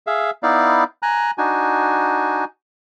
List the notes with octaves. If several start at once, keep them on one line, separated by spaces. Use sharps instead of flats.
G#4 E5 F5
B3 D#4 E4 D5 F5
G#5 A#5 F#6
D4 D#4 F#4 G#5